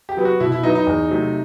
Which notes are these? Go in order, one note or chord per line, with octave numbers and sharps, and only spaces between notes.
G4
F#3 B3
F#4
B2 E4
E4
F#3 B3 D#4
D#4
E2
C3 F#3 A3